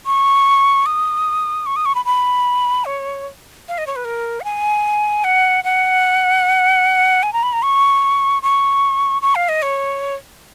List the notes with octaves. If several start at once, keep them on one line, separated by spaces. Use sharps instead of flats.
C#6
D#6
C#6
D#6
C#6
B5
B5
C#5
F5
D#5
C#5
B4
A#4
F#5
G#5
F#5
F#5
G#5
A#5
B5
A#5
C#6
C#6
C#6
F5
D#5
C#5